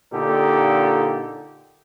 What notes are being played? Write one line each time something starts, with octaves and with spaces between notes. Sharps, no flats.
A#2 D3 D#4 G4 A4